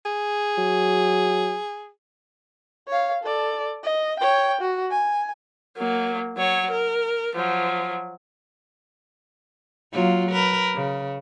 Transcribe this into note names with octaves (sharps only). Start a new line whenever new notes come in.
G#4
F#3
C#5 F5
A4 D5
D#5
C#5 G5
F#4
G#5
F#3 A#3
F#3 C#5
A#4
F3 F#3
F#3 A#3 F4
A#4 B4
C#3